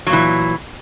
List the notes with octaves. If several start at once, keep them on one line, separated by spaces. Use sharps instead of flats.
A#2 E3 F#3